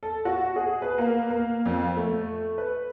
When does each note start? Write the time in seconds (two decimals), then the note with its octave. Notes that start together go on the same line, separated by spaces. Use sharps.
0.03 A4
0.25 F#4
0.56 G#4
0.82 B4
0.98 A#3
1.30 A#3
1.66 F2
1.97 A3
2.58 B4